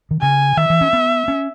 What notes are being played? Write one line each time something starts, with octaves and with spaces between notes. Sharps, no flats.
D#3
C#3 G#5
D#3 E5
E3
C#4
B3
C#4